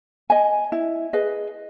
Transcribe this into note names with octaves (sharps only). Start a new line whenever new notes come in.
D#5 G#5
E4
G#4 B4 D#5